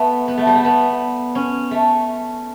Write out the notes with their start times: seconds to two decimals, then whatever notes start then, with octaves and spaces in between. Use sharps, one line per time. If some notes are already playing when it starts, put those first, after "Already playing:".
Already playing: A3 B3
0.28 B3
0.38 A3
0.47 G3
0.55 A3
0.65 B3
1.35 C#4
1.71 A3